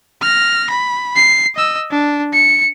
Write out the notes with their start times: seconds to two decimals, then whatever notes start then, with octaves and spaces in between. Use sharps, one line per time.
0.21 F6 A#6
0.70 B5
1.16 C7
1.56 D#5 E6
1.91 D4
2.33 C#7